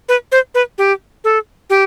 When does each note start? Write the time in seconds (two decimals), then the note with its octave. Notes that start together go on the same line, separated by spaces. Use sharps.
0.09 B4
0.32 C5
0.55 B4
0.78 G4
1.24 A4
1.70 G4